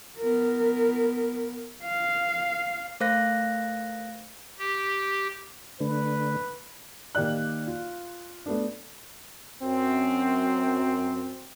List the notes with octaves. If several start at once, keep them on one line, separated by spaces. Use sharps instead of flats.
B3 A#4
F5
A3 A#4 C5 F5 F#6 A#6
G4
D3 A3 D4 B4
D#3 A#3 G4 D5 F#6
F4
A3 B3 D4
F#2 C4